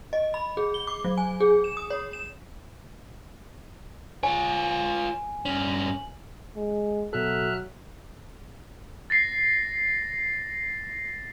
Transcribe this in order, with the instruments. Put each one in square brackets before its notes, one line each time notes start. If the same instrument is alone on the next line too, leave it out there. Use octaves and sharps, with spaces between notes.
[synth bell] D#5
B5
G#4
G7
D6
F#3
G#5
G#4
E7
D#6
C#5
E7
[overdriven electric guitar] F4 C#5 [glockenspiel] G#5
[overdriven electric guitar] G2 C#4 [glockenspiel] F#7
[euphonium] G#3
[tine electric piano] B2 A4 [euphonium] F#3 [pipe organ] E5 F6 F#6
[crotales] A6 A#6 C7